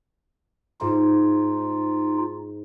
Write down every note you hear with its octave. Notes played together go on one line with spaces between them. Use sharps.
G#2 D#4 F4